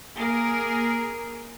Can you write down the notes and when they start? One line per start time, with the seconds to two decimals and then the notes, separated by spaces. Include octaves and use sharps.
0.17 A#3 G#4 A#4